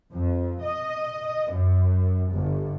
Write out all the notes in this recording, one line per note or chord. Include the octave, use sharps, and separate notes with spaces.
F2
D#5
F#2
G1